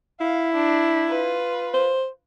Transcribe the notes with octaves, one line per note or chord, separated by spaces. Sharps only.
E4 F5
D4
F4 B4
C5